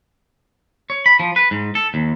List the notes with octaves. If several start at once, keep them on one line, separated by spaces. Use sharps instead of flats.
C#5
B5
F3
B4
G#2
A4
D#2